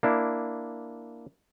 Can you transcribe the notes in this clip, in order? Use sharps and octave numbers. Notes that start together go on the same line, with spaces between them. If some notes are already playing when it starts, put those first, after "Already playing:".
A#3 D4 E4